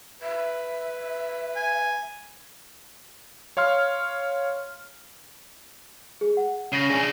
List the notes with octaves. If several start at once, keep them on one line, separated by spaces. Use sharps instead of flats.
B4 E5
G#5
C#5 F5 C6 F6
G#4
F#5
C#3 A#6 C7
D4 G#4 G#5 A#6